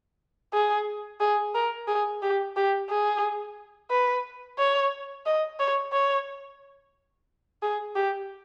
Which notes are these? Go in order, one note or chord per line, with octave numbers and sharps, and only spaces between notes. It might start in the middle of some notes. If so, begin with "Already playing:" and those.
G#4
G#4
A#4
G#4
G4
G4
G#4
B4
C#5
D#5
C#5
C#5
G#4
G4